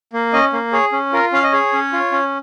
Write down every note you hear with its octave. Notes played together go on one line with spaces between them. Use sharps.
A#3
C#4 D#5
A#3
G#4 C#5
C#4
F4 A#4
C#4 F5
D#5
G#4 C#5
C#4
F4
C#4